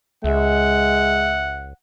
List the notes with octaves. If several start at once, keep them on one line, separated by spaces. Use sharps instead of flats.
C#2 G#3 E5 F#5